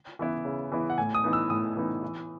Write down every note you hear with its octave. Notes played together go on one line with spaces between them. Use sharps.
E3 B3 E4
C#3
E3 B3 E4
F#5
A2 G#5
D#6
E3 B3 D#4
E6
A2 D#6
E3 B3 D#4
E3